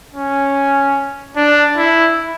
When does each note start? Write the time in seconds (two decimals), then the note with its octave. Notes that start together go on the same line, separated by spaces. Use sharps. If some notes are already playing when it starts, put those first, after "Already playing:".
0.14 C#4
1.36 D4
1.77 E4